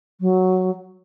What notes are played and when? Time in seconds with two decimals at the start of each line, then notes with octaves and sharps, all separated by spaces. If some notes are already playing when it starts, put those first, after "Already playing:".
0.21 F#3